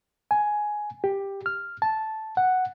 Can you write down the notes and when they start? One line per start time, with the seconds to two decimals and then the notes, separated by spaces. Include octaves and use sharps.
0.31 G#5
1.04 G4
1.46 F6
1.82 A5
2.37 F#5